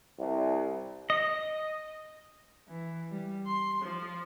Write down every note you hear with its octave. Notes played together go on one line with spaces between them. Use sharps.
C2
D#5
E3
G3
C6
F3